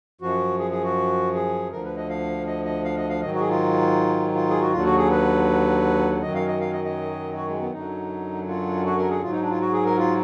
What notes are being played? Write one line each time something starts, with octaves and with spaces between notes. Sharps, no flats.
F#2 F3 F#4
G#4
G#4
F#4
G#4
D2 D3 F3 A#4
B4
D#5
F5
D#5
D#5
F5
D#5
F5
G#2 D#3 F#3 D#5
F#4
G#4
F4
F4
G#4
F#4
D#2 D3 F#3 F4
F#4
G#4
B4
F#2 D#3 F#3 D#5
F5
D#5
F5
D#5
D#5
F#4
G#3
B3
F#2 D3 F#3 D#4
F4
F#4
A#4
G#4
G#2 F#3 F4
D#4
D4
F4
F#4
G#4
A#4
F4